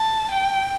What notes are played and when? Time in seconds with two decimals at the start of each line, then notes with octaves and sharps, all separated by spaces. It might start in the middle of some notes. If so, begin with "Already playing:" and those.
Already playing: A5
0.31 G5